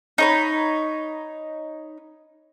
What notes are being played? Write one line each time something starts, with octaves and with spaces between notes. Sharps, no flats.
D#4 C#5 B5